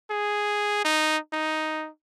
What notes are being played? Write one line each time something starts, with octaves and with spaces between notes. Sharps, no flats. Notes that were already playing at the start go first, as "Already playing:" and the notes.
G#4
D#4
D#4